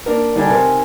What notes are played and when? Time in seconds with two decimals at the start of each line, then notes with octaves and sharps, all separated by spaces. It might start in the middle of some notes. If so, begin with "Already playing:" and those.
0.06 A#3 D4 A#4
0.36 D3 G3 D4 D#4 G#5
0.50 C3 A#4